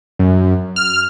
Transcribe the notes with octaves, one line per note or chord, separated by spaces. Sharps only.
F#2
F6